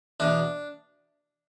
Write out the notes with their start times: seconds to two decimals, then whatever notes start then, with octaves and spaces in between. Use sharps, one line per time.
0.20 E2 B2 D4